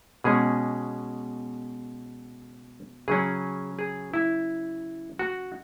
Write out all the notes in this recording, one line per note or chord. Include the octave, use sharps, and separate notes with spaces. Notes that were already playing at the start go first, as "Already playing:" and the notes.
B2 G#3 C#4 G#4
C#3 F#3 C#4 G#4
G#4
E4
F#4